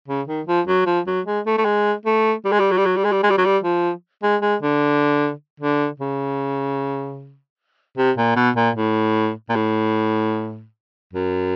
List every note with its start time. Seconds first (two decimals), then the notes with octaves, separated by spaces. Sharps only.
0.08 C#3
0.28 D#3
0.47 F3
0.68 F#3
0.86 F3
1.07 F#3
1.26 G#3
1.46 A3
1.58 A3
1.65 G#3
2.06 A3
2.45 G3
2.52 G#3
2.60 G3
2.72 F#3
2.78 G3
2.86 F#3
2.97 G3
3.05 G#3
3.12 G3
3.23 G#3
3.30 G3
3.38 F#3
3.45 G3
3.64 F3
4.23 G#3
4.42 G#3
4.62 D3
5.60 D3
6.00 C#3
7.98 C3
8.18 A#2
8.36 B2
8.56 A#2
8.76 A2
9.49 A#2
9.56 A2
11.13 F#2